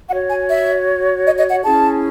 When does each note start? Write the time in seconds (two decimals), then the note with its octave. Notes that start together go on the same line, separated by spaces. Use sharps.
0.10 F#4 C#5 F#5
0.29 G#5
0.48 E5
1.26 D#5
1.39 D#5
1.51 F#5
1.63 C#4 E4 G#4 A5